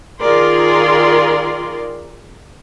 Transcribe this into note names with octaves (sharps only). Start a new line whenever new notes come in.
D#3 F4 G#4 A#4 D5 C6